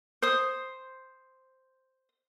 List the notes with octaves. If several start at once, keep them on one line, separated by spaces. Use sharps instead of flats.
C5 D#6